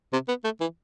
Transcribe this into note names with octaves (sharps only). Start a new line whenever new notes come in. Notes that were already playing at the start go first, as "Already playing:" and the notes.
C3
B3
A3
E3